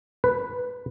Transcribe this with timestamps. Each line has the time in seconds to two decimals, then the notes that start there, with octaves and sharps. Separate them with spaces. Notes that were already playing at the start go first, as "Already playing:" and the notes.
0.24 B4